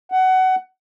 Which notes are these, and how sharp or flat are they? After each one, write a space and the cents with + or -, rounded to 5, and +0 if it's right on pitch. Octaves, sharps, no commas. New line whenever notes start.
F#5 +20